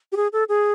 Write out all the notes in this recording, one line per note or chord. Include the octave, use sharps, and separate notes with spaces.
G4
G#4
A4
G#4